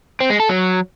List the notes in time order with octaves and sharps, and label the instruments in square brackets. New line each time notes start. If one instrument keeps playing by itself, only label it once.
[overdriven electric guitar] C4
G#3
A4
F#3